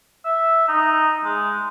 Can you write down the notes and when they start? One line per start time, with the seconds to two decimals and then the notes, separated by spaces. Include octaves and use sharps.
0.25 E5
0.68 D#4
1.25 G#3